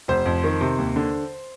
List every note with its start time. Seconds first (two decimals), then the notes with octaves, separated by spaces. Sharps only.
0.08 F1 C5
0.26 F2
0.44 D#3
0.61 C3
0.78 D#2
0.96 D3